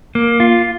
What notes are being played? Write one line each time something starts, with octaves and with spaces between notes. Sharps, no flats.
A#3
F4